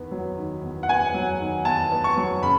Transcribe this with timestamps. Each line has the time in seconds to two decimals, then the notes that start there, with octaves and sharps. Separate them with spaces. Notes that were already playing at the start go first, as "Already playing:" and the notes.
Already playing: E2 D#3 B3
0.12 F#3
0.37 D#3
0.63 E2
0.83 F#5
0.88 B3 G#5
1.14 F#3
1.40 D#3
1.65 E2 A5
1.92 B3
2.04 C#6
2.17 F#3
2.43 C#3 B5